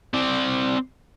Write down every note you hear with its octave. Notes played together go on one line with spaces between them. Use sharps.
C4 D5